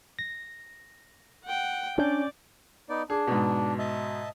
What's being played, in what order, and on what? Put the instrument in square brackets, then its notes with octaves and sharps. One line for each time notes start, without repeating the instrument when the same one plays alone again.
[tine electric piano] A#6
[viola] F#5 G5
[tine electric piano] C#4 G6 [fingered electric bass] D4 [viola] D5 D6
[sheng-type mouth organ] B3 D#4 D5
[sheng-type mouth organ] D4 [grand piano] G#4
[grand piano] G#2 B2
[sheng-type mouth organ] D#5 E5 A5